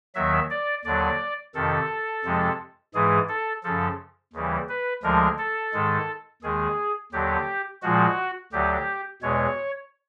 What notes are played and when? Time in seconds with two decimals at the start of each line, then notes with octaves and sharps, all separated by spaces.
0.15 D#2 D#3 F#3 E5
0.50 D5
0.85 D#2 D3 F#3 D5
1.55 F2 C3 D#3 A4
2.25 F2 C3 F3 G#3
2.94 G#2 E3 G#3 G#4
3.29 A4
3.64 F#2 C#3 F3 A4
4.33 D#2 C#3 E3 G3
4.69 B4
5.03 D2 D3 F3 G#3 A#4
5.38 A4
5.73 G#2 D#3 G#3
6.43 D#2 D#3 G#3 G#4
7.12 D#2 D3 F#3 G4
7.82 A#2 F3 G#3 F#4
8.52 D2 D3 F#3 G4
9.22 E2 B2 G#3 C#5